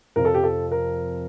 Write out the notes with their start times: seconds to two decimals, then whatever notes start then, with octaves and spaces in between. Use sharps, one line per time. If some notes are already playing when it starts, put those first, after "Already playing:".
0.16 F2 C3 F3 C4 A#4
0.25 A4
0.34 G4
0.44 A4
0.72 A#4